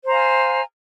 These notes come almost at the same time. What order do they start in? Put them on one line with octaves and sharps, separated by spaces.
C5 A#5 F5 G#5